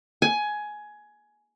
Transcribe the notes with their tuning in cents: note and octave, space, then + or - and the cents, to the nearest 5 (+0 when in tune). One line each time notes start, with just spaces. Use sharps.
G#5 +15